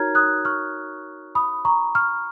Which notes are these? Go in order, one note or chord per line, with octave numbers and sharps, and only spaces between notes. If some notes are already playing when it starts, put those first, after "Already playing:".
Already playing: D#4 F#4 A#4 C#5 A#5 F6 G#6
D#6 F#6
C#6 F6
B5 D#6
A#5 C#6
C#6 F6